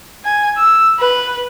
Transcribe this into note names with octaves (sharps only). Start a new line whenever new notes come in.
G#5
E6
B4